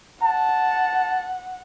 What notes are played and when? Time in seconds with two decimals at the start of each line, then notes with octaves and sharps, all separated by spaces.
0.23 F#5 A5